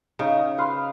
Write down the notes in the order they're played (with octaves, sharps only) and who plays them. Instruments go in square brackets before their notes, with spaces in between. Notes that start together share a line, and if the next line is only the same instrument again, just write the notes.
[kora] C#3 [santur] D#4
[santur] B4 F5 C6